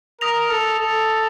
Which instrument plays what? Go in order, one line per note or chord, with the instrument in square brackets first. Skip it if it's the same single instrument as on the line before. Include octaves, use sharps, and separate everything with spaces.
[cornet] A#4 [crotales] D#6 A#6 F7
[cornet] A4
A4